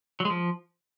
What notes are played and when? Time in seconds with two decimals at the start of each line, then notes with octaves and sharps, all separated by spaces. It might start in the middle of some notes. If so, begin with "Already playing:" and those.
0.20 F#3
0.25 G#3
0.30 F3